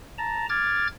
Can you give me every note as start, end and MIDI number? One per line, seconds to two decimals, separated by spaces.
0.18 0.46 81
0.18 0.46 82
0.49 0.87 86
0.49 0.87 89
0.49 0.87 92
0.49 0.87 93